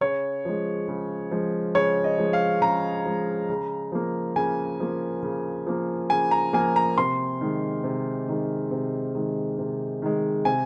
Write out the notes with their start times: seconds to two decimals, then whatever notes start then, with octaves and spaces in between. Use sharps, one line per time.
0.01 C#3 C#5
0.45 F3 G#3
0.88 C#3
1.31 F3 G#3
1.75 C#3 C#5
2.04 D#5
2.18 F3 G#3
2.33 F5
2.61 C#3 A#5
3.06 F3 G#3
3.49 C#3
3.92 F3 A#3
4.36 C#3 G#5
4.80 F3 A#3
5.23 C#3
5.67 F3 A#3
6.10 C#3 G#5
6.31 A#5
6.53 F3 A#3 G#5
6.76 A#5
6.98 C3 C6
7.41 D#3 G#3
7.84 C3
8.28 D#3 G#3
8.71 C3
9.15 D#3 G#3
9.58 C3
10.02 D#3 G#3
10.45 C3 G#5